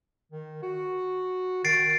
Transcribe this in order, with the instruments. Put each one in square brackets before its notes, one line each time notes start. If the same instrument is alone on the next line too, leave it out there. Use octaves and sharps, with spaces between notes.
[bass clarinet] D#3
F#4
[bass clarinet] D#3 [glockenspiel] A6 C7 D7